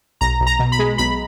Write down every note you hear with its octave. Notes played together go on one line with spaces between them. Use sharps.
B1 A#5
B1
A#5
B2
B5
G#3
B1 B5